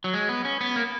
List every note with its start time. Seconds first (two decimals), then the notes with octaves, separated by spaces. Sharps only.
0.04 F#3
0.14 G#3
0.29 B3
0.45 C#4
0.61 B3
0.76 A#3